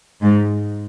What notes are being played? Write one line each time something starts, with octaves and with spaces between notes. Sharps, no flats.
G#2